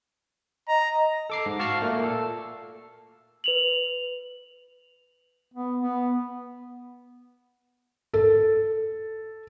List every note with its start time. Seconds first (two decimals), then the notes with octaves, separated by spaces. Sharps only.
0.68 D#5 A#5
1.30 A4 D6 C7
1.46 G#2
1.59 F#4 F5 A5 C#6 F6 C7
1.82 A#2 A3 A#3
2.04 A4
3.44 B4 F7 F#7
5.54 B3
5.80 B3
8.14 A4